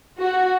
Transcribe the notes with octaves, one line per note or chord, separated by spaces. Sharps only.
F#4